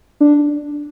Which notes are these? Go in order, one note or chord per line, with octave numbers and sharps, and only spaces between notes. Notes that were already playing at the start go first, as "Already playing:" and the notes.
D4